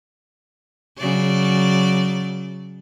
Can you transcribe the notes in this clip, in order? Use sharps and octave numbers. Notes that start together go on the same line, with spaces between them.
C#3 F#3 D5